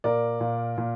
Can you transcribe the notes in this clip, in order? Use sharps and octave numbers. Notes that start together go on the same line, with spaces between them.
A#2 A#4 D5
A#2
A#2